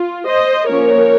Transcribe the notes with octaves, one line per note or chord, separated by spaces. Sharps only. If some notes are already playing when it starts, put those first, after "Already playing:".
Already playing: F4
C5 D#5
F3 A#3 C#4 A#4 C#5